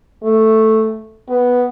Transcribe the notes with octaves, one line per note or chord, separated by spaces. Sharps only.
A3
B3